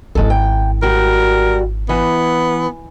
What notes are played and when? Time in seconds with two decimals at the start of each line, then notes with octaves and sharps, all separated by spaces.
0.15 G#1 G#3 E4 A4
0.30 G5
0.82 G3 F#4 A#4
1.89 E3 B3